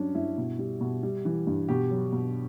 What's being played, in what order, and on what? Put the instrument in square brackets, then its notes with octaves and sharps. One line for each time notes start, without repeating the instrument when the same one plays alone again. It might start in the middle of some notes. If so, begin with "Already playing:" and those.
Already playing: [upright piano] G2 F#3 C#4 D4
G2 E4
B2
G3
B2
G3
E3
G2
B2 G4
F#3
B2